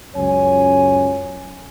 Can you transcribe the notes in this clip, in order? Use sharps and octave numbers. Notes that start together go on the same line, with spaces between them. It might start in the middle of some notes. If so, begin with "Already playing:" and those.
C#2 F#2 C#5 G#5